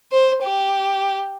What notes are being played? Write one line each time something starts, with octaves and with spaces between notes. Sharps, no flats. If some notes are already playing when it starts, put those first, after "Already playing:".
C5
G4